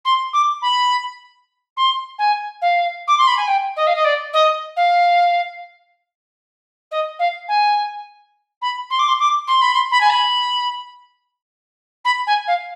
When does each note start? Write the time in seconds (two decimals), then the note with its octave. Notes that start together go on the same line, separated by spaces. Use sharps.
0.05 C6
0.33 D6
0.61 B5
1.76 C6
2.18 G#5
2.61 F5
3.07 D6
3.18 C6
3.27 B5
3.37 G#5
3.47 G5
3.76 D#5
3.87 F5
3.95 D#5
4.04 D5
4.33 D#5
4.76 F5
6.91 D#5
7.19 F5
7.48 G#5
8.61 B5
8.90 C6
8.99 D6
9.08 C6
9.19 D6
9.47 C6
9.61 B5
9.74 C6
9.91 B5
10.00 G#5
10.10 B5
12.04 B5
12.27 G#5
12.47 F5